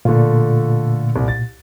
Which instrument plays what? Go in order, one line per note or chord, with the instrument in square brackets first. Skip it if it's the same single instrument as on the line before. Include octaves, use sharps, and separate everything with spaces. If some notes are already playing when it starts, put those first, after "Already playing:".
[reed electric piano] A#2 [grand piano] D3 A3 F4
[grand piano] C2
A6